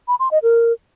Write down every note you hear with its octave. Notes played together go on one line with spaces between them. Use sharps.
B5
C6
D#5
A#4